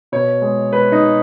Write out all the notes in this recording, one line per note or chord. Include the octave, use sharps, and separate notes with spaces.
B2 C#5
G#3
G#3 B4
D#4
G#3